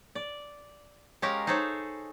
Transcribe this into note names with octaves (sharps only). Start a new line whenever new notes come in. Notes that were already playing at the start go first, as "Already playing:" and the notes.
D5
G#3 C#4 G4 A#4 F5 A#5
D#4 G#4 A4 C5 C#5